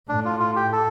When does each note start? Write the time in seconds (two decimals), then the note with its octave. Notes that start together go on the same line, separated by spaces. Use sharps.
0.08 A2 D4
0.25 F4
0.40 F4
0.56 G4
0.72 A4